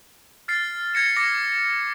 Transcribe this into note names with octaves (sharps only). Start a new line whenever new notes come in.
F6 A6 C7
G#6 A#6 C#7 E7
D6 A#6 C#7